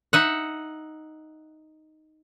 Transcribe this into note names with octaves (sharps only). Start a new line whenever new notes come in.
D#4 E5 F#5